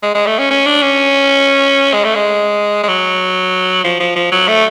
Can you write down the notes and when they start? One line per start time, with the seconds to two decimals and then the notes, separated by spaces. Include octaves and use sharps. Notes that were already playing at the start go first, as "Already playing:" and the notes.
0.03 G#3
0.15 G#3
0.26 A3
0.39 C#4
0.51 C#4
0.66 D4
0.82 C#4
1.93 G#3
2.04 A3
2.15 G#3
2.83 G#3
2.89 F#3
3.84 F3
4.00 F3
4.16 F3
4.32 F#3
4.48 A3